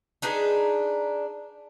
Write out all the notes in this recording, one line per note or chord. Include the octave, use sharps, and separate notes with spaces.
D4 D#4 G#4 B4